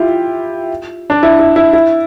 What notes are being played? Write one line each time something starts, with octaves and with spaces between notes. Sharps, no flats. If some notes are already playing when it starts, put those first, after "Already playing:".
Already playing: E4 F4 G4
D4
E4
E4
E4
E4